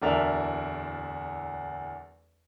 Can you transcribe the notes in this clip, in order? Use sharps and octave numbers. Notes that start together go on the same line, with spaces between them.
D1 E2 D4 A#4 E5 F7